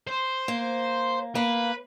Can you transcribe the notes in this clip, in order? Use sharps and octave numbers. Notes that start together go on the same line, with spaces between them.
C5
A#3
A#3 B4